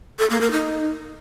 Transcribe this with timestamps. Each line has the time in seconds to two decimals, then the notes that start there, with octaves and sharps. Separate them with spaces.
0.19 A4
0.30 A#3
0.41 A#4
0.52 D#4